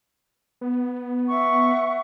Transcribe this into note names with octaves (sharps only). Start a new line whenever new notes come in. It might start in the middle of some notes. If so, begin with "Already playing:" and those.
B3
E5 F#5 C#6